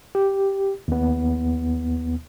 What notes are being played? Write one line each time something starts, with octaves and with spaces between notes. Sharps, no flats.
G4
D#2 B3